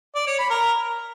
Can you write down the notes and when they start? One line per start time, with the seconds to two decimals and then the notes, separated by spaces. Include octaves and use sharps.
0.15 D5
0.27 C#5
0.39 B5
0.50 A#4